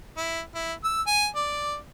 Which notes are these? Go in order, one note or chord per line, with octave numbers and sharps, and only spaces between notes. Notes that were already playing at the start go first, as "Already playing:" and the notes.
E4
E4
E6
G#5
D5